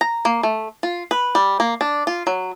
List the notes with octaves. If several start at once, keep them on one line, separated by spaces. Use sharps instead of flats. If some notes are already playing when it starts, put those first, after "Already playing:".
A#5
A#3
A3
F4
B4
G3
A#3
D4
F4
F#3